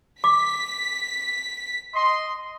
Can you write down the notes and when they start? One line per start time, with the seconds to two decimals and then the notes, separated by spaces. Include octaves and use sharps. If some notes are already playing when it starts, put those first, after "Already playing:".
0.24 D6 B6
1.95 D#5 C6